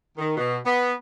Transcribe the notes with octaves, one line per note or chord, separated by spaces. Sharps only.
D#3
B2
B3